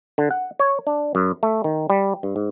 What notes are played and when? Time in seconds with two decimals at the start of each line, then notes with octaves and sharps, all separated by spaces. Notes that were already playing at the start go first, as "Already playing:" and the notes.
0.18 D3
0.31 F#5
0.59 C#5
0.87 D4
1.15 F#2
1.43 A3
1.64 D#3
1.90 G3
2.23 G2
2.36 G#2